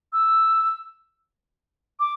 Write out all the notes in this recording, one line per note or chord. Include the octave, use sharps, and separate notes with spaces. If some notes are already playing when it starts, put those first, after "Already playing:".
E6
D6